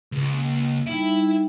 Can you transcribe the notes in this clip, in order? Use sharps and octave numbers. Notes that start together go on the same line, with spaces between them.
C#2
A#3
G3 D#4 E4 E5